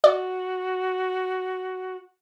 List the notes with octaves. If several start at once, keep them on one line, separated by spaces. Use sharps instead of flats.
F#4 D5